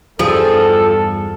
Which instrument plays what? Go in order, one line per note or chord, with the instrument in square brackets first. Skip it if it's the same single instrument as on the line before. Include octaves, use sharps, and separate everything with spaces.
[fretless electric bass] E2 G2 G3 [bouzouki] F3 G#4 [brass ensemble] A4